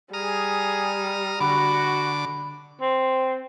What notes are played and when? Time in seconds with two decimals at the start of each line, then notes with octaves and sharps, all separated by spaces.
0.14 G3 G#4 A#5 D#6 F6
1.40 D3 F#4 B5 D6
2.81 C4